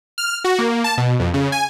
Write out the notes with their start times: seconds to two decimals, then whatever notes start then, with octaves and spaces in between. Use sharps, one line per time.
0.18 F6
0.44 F#4
0.59 A#3
0.84 A5
0.98 B2
1.20 F2
1.34 C#3
1.52 G#5